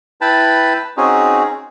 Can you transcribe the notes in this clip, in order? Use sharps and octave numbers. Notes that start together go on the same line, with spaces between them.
E4 B4 G5 A5 B5
C4 C#4 D#4 F#4 G#4